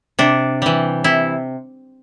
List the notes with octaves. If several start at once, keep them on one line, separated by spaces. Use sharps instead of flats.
C3 D4
E3 G3
C3 E4